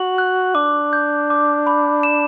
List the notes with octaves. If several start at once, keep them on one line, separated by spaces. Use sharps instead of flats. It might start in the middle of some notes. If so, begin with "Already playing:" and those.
Already playing: F#4 F#7
F#6
D4 D6
G6
D6
B5
E7